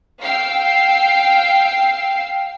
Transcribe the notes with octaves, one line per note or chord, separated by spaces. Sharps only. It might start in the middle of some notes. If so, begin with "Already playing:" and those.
F5 G5 E6 C7